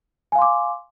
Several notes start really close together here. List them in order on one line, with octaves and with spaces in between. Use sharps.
G#5 F5 C6 D6